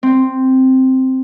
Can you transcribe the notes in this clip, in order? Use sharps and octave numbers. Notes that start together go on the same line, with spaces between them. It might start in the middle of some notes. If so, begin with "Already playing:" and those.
C4